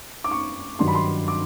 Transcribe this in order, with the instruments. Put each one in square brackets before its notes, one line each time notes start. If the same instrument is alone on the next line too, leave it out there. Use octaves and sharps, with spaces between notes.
[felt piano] D6
C#6
G2 D#3 F#3 C6
B5
C6
D6